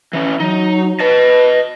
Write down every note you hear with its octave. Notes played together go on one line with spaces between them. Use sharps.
E3 C#4
F#3 D#4
B4 D#5 A5